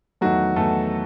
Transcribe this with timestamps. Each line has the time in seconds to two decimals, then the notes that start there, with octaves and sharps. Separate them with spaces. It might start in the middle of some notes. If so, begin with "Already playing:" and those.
0.21 E2 D#3 F#3 A3 F#4
0.56 E2 D#3 A3 A4